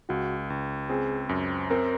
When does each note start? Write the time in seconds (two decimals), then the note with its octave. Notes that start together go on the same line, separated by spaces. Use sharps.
0.09 C#2 F#4
0.50 C#2
0.89 C4 G#4
1.29 F#2
1.70 C4 A#4